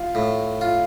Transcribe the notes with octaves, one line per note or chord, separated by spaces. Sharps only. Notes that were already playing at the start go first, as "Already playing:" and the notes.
Already playing: F4
A2
F4